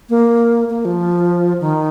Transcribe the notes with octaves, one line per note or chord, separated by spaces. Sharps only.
A#3
A#3
F3
D#3